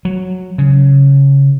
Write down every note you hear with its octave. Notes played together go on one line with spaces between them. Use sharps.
F#3
C#3